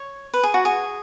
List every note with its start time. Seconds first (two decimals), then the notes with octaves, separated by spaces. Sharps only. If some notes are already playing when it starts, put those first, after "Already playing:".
Already playing: C#5
0.34 B4
0.44 G#4
0.54 F#4
0.65 G#4